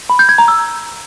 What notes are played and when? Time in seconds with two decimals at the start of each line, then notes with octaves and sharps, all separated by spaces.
0.10 B5
0.19 G6
0.29 G#6
0.38 A#5
0.48 E6